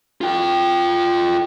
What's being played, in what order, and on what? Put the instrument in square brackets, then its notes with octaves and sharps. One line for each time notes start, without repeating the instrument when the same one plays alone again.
[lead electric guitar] F4 G5